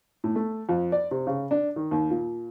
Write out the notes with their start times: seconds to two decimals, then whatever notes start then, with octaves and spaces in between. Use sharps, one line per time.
0.24 A2
0.36 A3
0.69 F2
0.92 D5
1.11 C3
1.27 C#3
1.51 D4
1.76 D#3
1.91 D#2
2.11 A#2